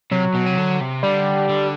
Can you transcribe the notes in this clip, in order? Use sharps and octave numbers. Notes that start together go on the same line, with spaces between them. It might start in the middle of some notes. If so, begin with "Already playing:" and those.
C3 F#3
B2
C3
D3
C3
D3 G3
D3